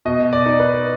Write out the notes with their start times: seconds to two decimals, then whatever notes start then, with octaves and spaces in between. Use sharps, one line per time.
0.05 B2 D#5
0.33 D5
0.46 D#4
0.59 B4